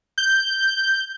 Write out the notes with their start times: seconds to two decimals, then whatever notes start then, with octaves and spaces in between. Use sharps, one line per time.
0.18 G6